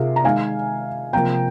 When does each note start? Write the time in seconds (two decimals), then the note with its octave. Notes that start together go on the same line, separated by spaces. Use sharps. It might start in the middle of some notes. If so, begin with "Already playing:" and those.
Already playing: C3 F4 G#4 A#4
0.16 A#5
0.24 D#3 G#3 F5 G#5
1.13 C3 F3 A#3 G5 A#5